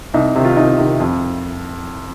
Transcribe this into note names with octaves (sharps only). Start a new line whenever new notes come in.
C2 D#4
C3 D#3
F4
C2 D#4
C3 D#3
F2